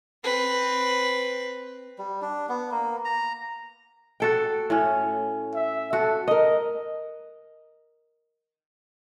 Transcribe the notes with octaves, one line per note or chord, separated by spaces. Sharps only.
C4 B4
G3
D4
B3
A#3
A#5
F#4 A4 G5
A2 C#4
E5
F#4 A4
A#4 D#5